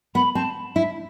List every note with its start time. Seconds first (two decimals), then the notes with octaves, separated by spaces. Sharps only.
0.15 B3 B5
0.35 C4 A5
0.75 E4 E5